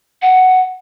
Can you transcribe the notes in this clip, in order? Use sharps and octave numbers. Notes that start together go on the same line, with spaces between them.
F#5